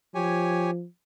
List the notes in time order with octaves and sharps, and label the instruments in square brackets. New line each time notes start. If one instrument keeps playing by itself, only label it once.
[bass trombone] F3 [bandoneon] G4 C#5 G#5